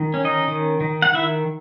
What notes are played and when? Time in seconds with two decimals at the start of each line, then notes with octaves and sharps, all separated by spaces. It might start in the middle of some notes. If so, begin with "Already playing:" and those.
Already playing: D#3
0.14 C#4
0.24 D#4 D#5
0.48 D#3
0.81 D#3
1.02 F#5
1.14 D#3 E4 E5